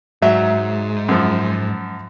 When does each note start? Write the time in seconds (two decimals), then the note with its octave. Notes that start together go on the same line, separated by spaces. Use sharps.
0.22 G#2 F#3 E5
1.09 F#2 F3